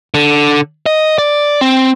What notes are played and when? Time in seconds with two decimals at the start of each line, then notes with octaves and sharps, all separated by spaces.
0.14 D3
0.86 D#5
1.18 D5
1.61 C4